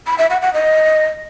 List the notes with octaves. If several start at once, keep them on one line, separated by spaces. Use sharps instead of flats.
B5
E5
F#5
F#5
D#5